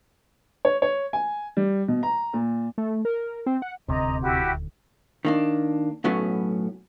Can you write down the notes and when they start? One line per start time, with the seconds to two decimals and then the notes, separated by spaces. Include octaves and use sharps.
0.65 C#5
0.82 C#5
1.13 G#5
1.57 G3
1.88 B2
2.03 A#5
2.34 A#2
2.78 A3
3.05 A#4
3.46 C4
3.62 F#5
3.88 D#1 D2 C3 D#5 A#5
4.22 E4 F#4 G4
5.25 D#3 A#3 D4
6.04 B1 A2 F#3 B3 C#4